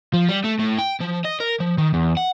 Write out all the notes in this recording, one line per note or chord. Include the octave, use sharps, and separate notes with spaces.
F3
G3
A3
A2
G5
F3
D#5
A#4
F3
D#3
E2
F#5